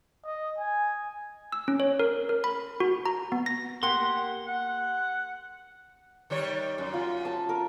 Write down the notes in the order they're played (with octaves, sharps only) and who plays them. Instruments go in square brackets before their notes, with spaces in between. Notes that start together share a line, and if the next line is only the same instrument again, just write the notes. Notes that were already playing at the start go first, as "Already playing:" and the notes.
[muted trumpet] D#5
G#5
[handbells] E6
C#4
C#5
A#4
A#4
B5
F#4
A#5
B3
A#6
[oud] A#3 G4 A#4 [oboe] F#5 [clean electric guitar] C6
[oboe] F#5
[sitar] D#3 G3 C#5
F#2
[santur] F4
A5
A#4